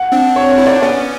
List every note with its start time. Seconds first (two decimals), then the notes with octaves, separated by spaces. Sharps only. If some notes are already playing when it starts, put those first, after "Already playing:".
Already playing: F#5
0.12 C4 D4
0.36 C#5
0.52 C#5
0.58 E4
0.66 D#4 D5
0.75 D4
0.82 B3 C#4 D5